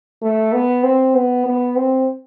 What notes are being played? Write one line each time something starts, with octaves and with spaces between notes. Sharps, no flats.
A3
B3
C4
B3
B3
C4